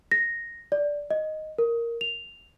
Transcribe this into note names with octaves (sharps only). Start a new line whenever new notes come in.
A#6
D5
D#5
A#4
F7